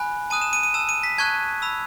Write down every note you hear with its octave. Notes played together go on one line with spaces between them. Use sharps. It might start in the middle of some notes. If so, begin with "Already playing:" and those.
Already playing: G#5 B5 F#6
A5 D#6 F#6 D#7
E7
D#7
D#7
A5 E6 E7
D#7
B6
A5 C#6 F#6 G#6
B5 E6